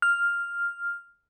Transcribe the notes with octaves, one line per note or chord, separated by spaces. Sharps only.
F6